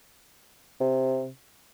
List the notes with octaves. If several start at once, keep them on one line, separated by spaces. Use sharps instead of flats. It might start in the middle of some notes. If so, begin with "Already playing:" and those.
C3